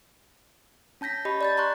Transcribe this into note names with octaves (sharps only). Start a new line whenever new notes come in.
C#4 A5 G6 A#6 B6
G4 D#5 A5 B5
D5 G6 A6
A#5 C6 C#6 F#6